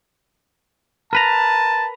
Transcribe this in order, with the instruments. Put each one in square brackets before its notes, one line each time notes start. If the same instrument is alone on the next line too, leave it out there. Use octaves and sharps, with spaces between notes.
[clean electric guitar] A#4 B4 A#5 [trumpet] A5